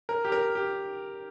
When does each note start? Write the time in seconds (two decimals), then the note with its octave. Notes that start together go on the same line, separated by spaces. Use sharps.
0.09 A#4
0.25 G4
0.32 A#4
0.55 G4